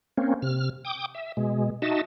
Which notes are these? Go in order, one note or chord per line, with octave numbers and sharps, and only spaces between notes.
A#3 C4 C#4
C3 F6
G5 D6 D#6
E5
B2 G#3
D#4 F#4 D#5 E5 A5